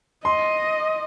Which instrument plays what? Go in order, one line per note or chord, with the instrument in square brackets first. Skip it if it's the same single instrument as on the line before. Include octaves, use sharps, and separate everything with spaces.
[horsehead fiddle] D#5 [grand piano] C6